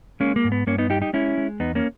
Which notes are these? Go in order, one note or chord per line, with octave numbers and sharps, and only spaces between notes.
G#3 A#3 C#4
A#3
G#2
B3
G2 A#3 C#4
B3 D#4
G3 D#4 G4
D#4 G4
G#3 C#4 E4
G#3
E2 B3 D#4
A#3 C#4